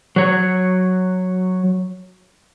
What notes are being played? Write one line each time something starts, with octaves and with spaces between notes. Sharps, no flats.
F#3 C#5